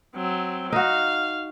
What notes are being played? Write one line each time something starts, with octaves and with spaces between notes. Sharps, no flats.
F#3 C4
D#4 F#4 F5